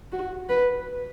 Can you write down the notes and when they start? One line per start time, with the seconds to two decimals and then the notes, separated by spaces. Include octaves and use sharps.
0.12 F#4
0.49 B4